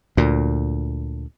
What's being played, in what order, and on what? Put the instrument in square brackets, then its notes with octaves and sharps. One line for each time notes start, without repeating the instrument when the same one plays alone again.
[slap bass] D2 A#2